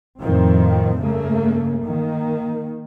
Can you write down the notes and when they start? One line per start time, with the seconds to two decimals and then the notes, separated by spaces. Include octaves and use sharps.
0.20 F2 A2 D#3 F3 C4
0.98 G2 C#3 A3 A#3
1.83 D#3 A#3